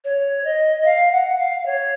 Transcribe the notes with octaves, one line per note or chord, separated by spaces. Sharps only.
C#5
D#5
F5
F#5
F5
C#5